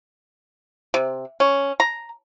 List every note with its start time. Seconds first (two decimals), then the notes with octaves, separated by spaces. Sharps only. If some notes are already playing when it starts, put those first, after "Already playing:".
0.94 C3
1.40 C#4
1.80 A#5